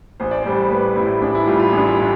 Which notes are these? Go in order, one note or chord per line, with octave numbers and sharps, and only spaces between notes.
A1 C5
D5
A2 G3 C5
A1 B4
A2 G3 E4
A1 D4
E4
A2 G3 F4
F4
E4
A1
D4
E4
A2